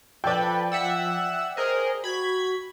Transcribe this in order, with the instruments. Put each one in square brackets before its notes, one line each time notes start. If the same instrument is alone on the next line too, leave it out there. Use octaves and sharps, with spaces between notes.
[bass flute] F3 [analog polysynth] A4 B4 [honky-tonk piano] D5 G5
[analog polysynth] E5 F#5 E6
[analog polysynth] G#4 A#4 D#5 [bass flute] C5
[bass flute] F#4 [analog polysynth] B5 G#6